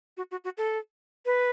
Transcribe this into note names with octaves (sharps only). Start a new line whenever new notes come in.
F#4
F#4
F#4
A4
B4